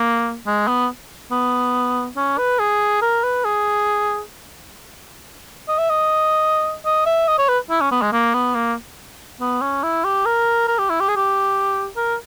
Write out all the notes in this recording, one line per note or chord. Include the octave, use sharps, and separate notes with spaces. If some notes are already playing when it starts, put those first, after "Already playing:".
Already playing: A#3
G#3
B3
B3
C#4
B4
G#4
A#4
B4
G#4
D#5
E5
D#5
D#5
E5
D#5
C#5
B4
E4
C#4
B3
G#3
A#3
B3
A#3
B3
C#4
E4
G4
A#4
A#4
G4
E4
G4
G#4
G4
A#4